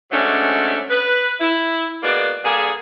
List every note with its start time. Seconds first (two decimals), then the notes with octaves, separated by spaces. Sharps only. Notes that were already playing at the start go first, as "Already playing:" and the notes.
0.12 C3 F#3 G#3 A3 C#4 D4
0.90 B4
1.40 E4
2.03 G#3 A#3 B3 F#4 D5
2.44 G2 D3 A#3 G#4